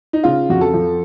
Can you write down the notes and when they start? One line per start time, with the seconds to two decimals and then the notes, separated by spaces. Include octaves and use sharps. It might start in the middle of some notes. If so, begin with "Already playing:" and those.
0.13 D#4
0.24 C#3 F4
0.50 F2 F#4
0.61 A4
0.74 F3